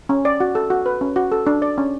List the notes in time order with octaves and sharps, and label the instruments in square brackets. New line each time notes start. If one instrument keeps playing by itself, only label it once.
[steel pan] C#4
D5
F#4
A4
F#4
B4
C#4
F#4
A4
D4
D5
C#4